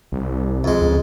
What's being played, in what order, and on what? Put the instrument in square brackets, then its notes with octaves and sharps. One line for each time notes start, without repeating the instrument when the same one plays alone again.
[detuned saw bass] C2
[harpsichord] F2 G#3
[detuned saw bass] C#2